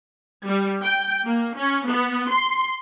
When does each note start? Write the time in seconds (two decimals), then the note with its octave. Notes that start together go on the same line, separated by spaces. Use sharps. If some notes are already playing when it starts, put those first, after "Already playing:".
0.46 G3
0.83 G5
1.25 A#3
1.58 C#4
1.88 B3
2.30 C6